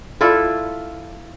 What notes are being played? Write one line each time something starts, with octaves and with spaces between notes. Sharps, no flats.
E4 F4 A4 D5